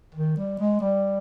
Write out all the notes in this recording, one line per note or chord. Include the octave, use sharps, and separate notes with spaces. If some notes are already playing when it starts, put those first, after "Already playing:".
D#3
G3
G#3
G3